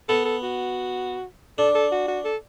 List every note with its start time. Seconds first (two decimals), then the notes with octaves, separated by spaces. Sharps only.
0.09 B3 A4
0.25 A4
0.43 F#4
1.58 D4 A4
1.75 A4
1.92 F#4
2.08 F#4
2.24 A4